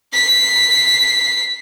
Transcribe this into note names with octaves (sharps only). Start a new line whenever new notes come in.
B6 C7